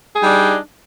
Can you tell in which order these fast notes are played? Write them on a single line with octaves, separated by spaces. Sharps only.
G#4 D#4 G3 D4